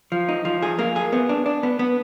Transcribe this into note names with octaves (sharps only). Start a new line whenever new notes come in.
F3
D#4
F3
G#4
A#3
G#4
B3
D4
D4
B3
B3